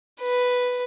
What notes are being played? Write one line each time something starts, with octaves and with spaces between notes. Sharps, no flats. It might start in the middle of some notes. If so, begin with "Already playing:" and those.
B4